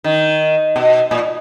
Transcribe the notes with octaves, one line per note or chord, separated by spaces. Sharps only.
D#3
B2
A#2